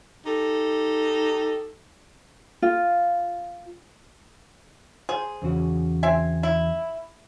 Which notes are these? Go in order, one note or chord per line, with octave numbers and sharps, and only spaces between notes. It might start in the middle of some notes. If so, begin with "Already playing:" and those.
D#4 G4 A4
F4
G#4 C5
E2 C#3 F#4
C4 E5 G#5
E4